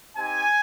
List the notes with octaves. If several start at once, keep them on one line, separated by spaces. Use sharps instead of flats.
C4 D#4 G4 G#5